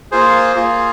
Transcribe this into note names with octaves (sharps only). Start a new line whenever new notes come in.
A#3 F4 G#4 C5
A#3 F4 G#4